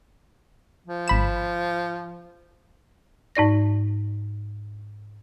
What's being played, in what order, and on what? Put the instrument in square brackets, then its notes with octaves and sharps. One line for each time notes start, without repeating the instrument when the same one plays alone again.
[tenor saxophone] F3
[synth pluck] G#1 B5 E7
[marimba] G#2 D#4 D5 A#6